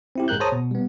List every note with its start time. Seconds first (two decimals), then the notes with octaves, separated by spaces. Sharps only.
0.16 C4 E4 G4
0.28 G#2 G#3 A#4 F#6 G6
0.40 G#4 C5 C#5 A5 A#5 D#6
0.52 B2
0.71 G3 B3